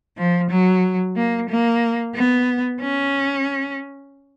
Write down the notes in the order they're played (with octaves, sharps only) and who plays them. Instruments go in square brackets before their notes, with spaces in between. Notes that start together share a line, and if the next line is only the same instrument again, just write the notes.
[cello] F3
F#3
A#3
A#3
B3
C#4